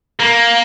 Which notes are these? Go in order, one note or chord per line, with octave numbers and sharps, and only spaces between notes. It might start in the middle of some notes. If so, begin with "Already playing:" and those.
A#3